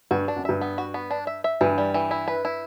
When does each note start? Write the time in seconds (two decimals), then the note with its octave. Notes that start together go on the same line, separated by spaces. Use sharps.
0.11 G2 F#4
0.28 D4
0.36 F#2
0.45 G2 E5
0.61 B3
0.78 F#4
0.94 B3
1.11 D4
1.27 E5
1.44 E5
1.61 G2 E3
1.78 G3
1.94 E3
2.11 E4
2.28 B4
2.45 E4